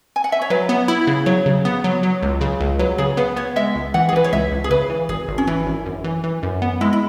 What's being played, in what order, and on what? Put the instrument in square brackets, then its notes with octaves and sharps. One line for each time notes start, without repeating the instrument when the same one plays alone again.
[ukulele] G#5
F#5
E5
C#5
[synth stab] F#3 [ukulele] B4
[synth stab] B3
E4
C#3
[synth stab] F#3 [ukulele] C#5
[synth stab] C#3
B3
F#3
F#3
C#2
C#3
C#2
[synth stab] F#3 [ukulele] B4
[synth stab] C#3 [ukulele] G#4
[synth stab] B3 [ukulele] B4
[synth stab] B3 [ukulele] C#5
[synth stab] G#3 [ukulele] E5
[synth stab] C#2
[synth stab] E3 [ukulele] F#5
[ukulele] G#4
[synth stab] E3 [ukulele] B4
[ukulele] C#5
[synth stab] C#2 [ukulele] E5
[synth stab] C#2
[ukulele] G#4
[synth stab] C#3 [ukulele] B4
[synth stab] E3
[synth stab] G#1 [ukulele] G#4
[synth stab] G#1
[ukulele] C#4
[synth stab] E3 [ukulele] E4
[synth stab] G#1
F#2
E3
E3
F#2
B3
[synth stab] G#3 [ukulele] E4
[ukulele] E4